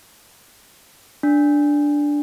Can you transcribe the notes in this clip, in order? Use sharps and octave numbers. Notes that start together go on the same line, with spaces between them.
D4